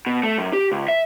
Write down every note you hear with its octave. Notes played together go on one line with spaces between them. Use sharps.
B2
A3
F#2
G4
C#2
E5